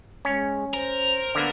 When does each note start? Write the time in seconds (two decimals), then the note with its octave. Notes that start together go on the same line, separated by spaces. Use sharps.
0.25 G#3 C#4
0.74 A#4 C5
1.35 D3 A#3 B3